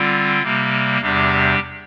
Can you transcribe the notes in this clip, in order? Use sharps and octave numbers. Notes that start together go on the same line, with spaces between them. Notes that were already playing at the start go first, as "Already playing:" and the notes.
Already playing: D3 G3 C4 F4
C3 G3 A#3
E2 C3 G3 D4 G4